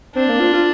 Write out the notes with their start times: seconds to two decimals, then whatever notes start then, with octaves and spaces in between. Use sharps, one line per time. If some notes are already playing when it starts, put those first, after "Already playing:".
0.15 C4 D4
0.29 A#3
0.40 F4
0.53 F4